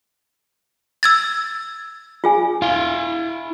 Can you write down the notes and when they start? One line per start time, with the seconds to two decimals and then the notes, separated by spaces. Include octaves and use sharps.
1.03 E6 G#6 A6
2.24 F4 G#4 G#5
2.62 E4 F5